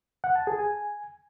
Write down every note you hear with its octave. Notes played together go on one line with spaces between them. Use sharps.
F#5
A5
G#4
G#5